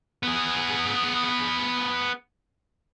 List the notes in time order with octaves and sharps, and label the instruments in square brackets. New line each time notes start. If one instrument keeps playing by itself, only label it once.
[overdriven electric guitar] B3 G#4